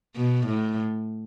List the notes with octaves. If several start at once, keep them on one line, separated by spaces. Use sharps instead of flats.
B2
A2